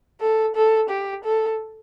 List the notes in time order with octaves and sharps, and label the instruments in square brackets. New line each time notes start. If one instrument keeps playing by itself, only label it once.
[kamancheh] A4
A4
G4
A4